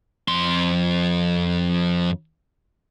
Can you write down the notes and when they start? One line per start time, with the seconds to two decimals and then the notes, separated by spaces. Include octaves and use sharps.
0.28 F2 C6